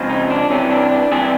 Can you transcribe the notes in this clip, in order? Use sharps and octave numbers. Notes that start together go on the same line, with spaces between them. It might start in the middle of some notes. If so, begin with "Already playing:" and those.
Already playing: F2 C#3 F3 G#3
D#4
D4
C3 E3 G3 C#4
D4
D4
C3 E3 G3 G#4